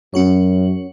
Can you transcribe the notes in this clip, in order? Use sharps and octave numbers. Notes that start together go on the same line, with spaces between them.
F#2 C#4 F#4 C#5